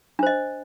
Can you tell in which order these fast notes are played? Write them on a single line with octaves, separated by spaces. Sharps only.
D4 C5 D#5